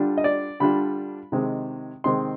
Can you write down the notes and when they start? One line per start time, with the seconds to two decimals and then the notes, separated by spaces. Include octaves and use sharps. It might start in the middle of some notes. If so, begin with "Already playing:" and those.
Already playing: D3 G3 D4 F4
0.18 D#5
0.24 D5
0.60 D3 G3 D4 F4 B5
1.32 C3 D#3 G#3 C4
2.04 C3 D#3 G#3 C4 C6